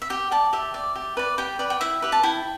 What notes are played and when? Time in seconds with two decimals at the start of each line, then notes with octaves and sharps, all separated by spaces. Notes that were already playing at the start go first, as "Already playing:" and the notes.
0.02 E5
0.10 G4 G5
0.31 D5 A5
0.53 G4 E5
0.74 D5
0.95 G4
1.17 B4 D5
1.38 G4 G5
1.59 B4 D5
1.70 G5
1.81 E4 E5
2.02 G4 B4
2.12 A5
2.23 E4 G5